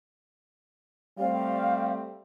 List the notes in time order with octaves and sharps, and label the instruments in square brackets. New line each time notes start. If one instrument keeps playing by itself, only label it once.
[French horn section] G3 A3 C4 [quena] F5